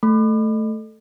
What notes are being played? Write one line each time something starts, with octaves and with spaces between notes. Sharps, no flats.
A3